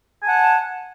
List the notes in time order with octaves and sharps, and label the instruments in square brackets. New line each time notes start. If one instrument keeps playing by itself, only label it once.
[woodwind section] G#5
A5
F#5